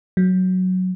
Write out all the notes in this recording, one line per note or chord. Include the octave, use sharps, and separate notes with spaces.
F#3